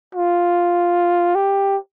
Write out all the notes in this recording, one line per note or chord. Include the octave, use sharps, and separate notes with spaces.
F4
G4